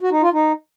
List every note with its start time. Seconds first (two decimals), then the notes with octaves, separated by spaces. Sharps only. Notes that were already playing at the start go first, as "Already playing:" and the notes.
0.01 F#4
0.11 D#4
0.22 F4
0.33 D#4